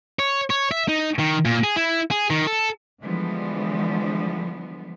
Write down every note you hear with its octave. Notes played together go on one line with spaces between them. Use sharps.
C#5
C#5
E5
D#4
D#3
A#2
G#4
E4
G#4
D#3
A4
D3 E3 F3 G3 G#3 B3